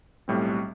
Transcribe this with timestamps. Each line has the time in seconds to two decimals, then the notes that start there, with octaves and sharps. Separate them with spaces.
0.28 B1 A2 G3 C4